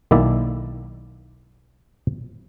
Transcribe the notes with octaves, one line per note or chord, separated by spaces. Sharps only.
B1 D#3 A#3 E4 D5 E5